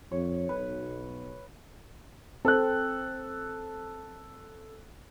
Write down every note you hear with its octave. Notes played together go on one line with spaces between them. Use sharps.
F2 C#5
B1 B4
C4 A4 F#6